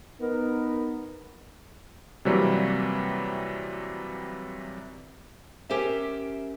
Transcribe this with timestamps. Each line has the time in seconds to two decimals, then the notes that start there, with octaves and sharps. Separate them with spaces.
0.20 B3 D#4 A#4
2.25 C3 E3 F#3 G3 A#3
5.69 C#4 G4 A#4 C5 E5